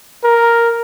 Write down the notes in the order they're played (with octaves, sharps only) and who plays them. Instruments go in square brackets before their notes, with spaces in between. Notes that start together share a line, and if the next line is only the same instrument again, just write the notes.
[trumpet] A#4